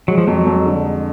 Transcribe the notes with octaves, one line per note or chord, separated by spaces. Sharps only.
F#3 G#3
F3
F2 F#3
F2
D3
G#3